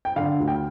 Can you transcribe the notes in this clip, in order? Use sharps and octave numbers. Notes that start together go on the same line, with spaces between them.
G5
D3 F5
D2
G5